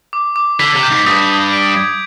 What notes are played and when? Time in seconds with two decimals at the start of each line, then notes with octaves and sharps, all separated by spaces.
0.13 D6
0.36 D6
0.59 D3 B6
0.75 C3
0.83 G6
0.91 G#2
1.06 G2 D#6
1.30 D#6
1.53 D7
1.77 G#6